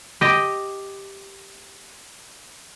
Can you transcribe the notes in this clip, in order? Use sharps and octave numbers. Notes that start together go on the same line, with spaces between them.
G4 D#5